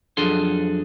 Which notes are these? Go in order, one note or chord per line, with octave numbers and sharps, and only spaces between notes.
F2 F#3 D4 G#4 A4 C6